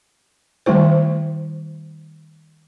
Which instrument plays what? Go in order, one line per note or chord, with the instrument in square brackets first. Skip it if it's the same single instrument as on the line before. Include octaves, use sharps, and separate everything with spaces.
[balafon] D#3 G3 A3 E4 C5